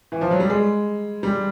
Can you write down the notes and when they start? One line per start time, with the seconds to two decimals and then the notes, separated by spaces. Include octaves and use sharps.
0.12 E3
0.21 F3
0.31 F#3
0.40 G3
0.50 G#3
1.23 G3